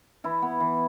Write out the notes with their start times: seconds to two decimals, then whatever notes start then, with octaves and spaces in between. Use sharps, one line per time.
0.24 E3 E4
0.42 B3
0.60 E3